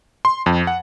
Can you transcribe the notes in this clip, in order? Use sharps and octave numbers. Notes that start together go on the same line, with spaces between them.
C6
F2
F#5